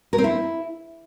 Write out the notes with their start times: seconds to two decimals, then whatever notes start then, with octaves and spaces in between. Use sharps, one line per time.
0.13 A#4
0.18 C4
0.24 E4